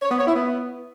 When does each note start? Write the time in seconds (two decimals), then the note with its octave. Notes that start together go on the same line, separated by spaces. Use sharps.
0.02 C#5
0.11 B3
0.19 C#5
0.27 E4
0.35 B3